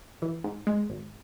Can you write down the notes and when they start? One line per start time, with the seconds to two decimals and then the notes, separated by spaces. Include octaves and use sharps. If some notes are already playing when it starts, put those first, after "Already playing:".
0.22 E3
0.44 G#2
0.67 G#3
0.90 G#1